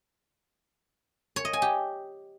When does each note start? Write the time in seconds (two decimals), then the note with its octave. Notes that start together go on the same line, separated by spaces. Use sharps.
1.36 C#5
1.45 D#5
1.53 G#5
1.62 G4